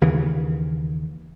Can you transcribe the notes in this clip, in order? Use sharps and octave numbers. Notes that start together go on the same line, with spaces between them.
D#2 C#3 E3